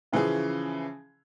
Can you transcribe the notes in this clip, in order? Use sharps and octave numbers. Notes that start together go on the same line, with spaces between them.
C#3 E3 F3 C#4 G#4